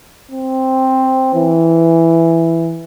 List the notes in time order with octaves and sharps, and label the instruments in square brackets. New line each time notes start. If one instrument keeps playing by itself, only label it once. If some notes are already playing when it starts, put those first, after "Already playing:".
[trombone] C4
E3